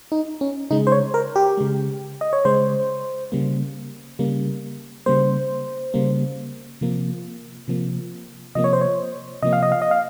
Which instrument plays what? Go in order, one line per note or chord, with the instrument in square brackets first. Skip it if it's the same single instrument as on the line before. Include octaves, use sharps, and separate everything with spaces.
[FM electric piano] D#4
C#4
C#3 G#3 D#4
C5
C#5
A#4
G4
C#3 G#3
D#5
C#5
C#3 G#3 C5
C#3 G3 A#3
C#3 G3 A#3
C#3 G3 A#3 C5
C#3 G3 A#3
C3 F3 A#3
C3 F3 A#3
C3 F3 A#3 D#5
C#5
C5
C#5
C3 F3 A#3 D#5
F5
D#5
F5
D#5
F5